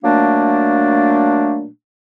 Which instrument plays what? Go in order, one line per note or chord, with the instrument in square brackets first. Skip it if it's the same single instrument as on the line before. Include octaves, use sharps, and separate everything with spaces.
[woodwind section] A#2 F#3 A3 A#3 D4